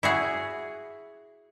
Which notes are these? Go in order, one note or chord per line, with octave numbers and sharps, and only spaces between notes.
E4 F#4 G#4